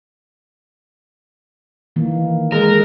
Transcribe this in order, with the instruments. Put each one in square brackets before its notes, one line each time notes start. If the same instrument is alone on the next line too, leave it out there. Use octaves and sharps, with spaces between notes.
[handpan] D#3 E3 A#3
[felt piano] G#3 A4 [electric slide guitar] A#4